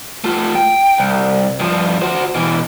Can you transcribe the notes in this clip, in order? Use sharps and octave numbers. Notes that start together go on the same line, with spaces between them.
A3 F4
G5
C2
G2 F3
F#4 C5
B2 E3